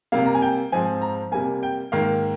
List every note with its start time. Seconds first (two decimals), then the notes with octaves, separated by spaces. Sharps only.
0.12 C3 G3 A#3 F5
0.26 A#5
0.35 G#5
0.42 G5
0.72 G#2 F3 C4 G#5
1.02 A#5
1.32 C3 G3 A#3 G#5
1.63 G5
1.92 G#2 D#3 A#3 F5